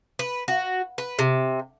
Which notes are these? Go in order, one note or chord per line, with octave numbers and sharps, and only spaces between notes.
B4
F#4
B4
C3